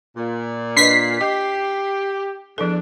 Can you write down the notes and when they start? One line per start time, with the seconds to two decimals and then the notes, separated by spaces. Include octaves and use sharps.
0.17 A#2
0.77 D4 B4 D#5 B6 C7
1.21 G4 D#5
2.58 E2 F3 D4 A4